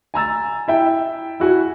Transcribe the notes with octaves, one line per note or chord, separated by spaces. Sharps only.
G#5 A#5 E6 A6
E4 E5 G5
E4 F#4 G#5